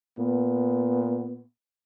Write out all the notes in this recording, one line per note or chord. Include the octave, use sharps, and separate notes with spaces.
A#2 B3